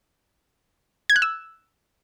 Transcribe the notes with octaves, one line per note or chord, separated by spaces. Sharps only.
G#6
F#6
E6